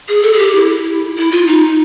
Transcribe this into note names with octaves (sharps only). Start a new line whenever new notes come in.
G#4
A4
G#4
G4
E4
E4
F4
D#4